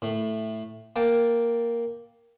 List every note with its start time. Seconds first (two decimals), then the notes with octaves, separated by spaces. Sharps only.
0.02 A2 A3
0.96 A#3 G5 A5